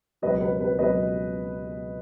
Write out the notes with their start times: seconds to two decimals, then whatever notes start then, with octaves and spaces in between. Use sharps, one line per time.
0.22 C#2 B2 F#3 B4 D#5
0.41 B4
0.61 B4
0.79 C#2 B2 F#3 B4 D#5